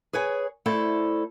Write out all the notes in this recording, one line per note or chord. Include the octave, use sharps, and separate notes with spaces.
G#4 B4 C#5 G#5
A3 E4 A4 C5 D5